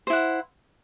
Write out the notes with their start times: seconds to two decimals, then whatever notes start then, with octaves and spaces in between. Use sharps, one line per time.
0.07 C5
0.10 E4
0.13 F#5